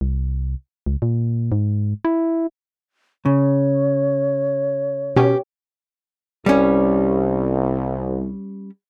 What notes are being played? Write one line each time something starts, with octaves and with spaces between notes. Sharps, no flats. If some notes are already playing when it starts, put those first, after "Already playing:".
C2
C#2
A#2
G#2
E4
C#3 C#5
B2 C#4 G4
C2 G3 C#4